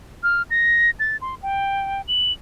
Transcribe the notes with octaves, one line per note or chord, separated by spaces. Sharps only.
F6
A#6
A6
C6
G5
F#7